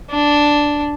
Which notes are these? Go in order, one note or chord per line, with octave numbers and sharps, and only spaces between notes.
D4